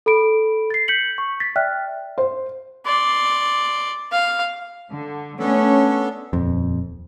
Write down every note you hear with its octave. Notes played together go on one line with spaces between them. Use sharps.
A4 B5 D7
A6 C7
G6 B6 C#7 F#7
C#6
A6 B6
D5 E5 G5 F6 F#6
C5
D5 C6
F5
D3
A3 B3 C#4 D4 A4
D#1 F2